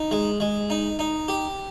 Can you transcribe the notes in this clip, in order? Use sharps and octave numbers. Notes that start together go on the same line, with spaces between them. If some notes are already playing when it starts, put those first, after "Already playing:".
Already playing: D#4
G#3
G#3
D#4
D#4
G4